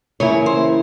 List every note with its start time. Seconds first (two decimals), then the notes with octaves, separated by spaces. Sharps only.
0.20 C#3 E3 A#3 E4 C#5
0.46 C5